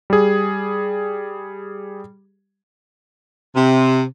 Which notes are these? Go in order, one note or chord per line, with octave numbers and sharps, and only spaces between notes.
G3 G#4
C3